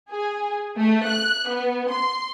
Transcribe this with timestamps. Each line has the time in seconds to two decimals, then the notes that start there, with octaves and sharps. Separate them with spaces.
0.11 G#4
0.77 A3
1.08 F#6
1.49 B3
1.90 C6